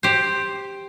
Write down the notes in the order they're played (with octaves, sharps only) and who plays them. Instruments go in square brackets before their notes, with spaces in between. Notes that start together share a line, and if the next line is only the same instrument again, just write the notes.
[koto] G4 C5